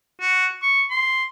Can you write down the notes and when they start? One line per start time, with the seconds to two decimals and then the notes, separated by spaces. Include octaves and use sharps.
0.21 F#4
0.63 C#6
0.90 C6